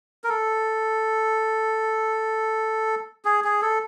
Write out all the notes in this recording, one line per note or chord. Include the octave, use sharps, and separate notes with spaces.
A#4
A4
G#4
G#4
A4